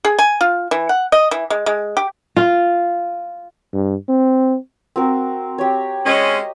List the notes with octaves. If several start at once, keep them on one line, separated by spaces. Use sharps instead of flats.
G#4
G#5
F4
E3
F#5
D#5
E3
G#3
G#3
G4
F4
G2
C4
C4 F#4 A#4
G4 C#5
G#3 C4 C#4 D#5